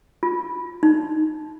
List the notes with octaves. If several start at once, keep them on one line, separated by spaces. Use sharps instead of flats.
F4
D#4